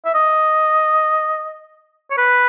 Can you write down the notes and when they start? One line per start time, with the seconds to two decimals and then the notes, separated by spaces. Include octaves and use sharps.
0.05 E5
0.14 D#5
2.10 C#5
2.17 B4